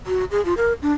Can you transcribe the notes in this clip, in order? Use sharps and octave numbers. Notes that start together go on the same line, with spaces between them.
F#4
G#4
F4
A#4
D4